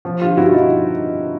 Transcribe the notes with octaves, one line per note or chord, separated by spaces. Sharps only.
F3
D3 F4 G4
G2 E4 F#4
F3 D#4 F4